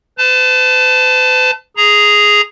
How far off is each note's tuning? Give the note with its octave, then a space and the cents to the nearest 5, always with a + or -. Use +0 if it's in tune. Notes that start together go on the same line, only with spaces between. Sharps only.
B4 +45 A5 +0
G#4 +0 A#5 +0